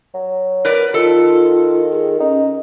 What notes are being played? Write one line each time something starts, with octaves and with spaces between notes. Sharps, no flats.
F#3
A#4 B4 D5
D#3 F4 A4
G#4
C#4 D#4